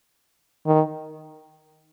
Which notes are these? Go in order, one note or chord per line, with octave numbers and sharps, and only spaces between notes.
D#3